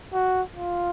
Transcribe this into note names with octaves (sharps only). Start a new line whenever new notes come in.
F#4
F4